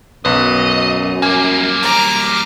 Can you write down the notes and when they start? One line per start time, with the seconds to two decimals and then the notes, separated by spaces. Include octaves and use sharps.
0.25 B1 F#2 B4 D#5
1.22 G3 A#3 G#5
1.83 A#5 D6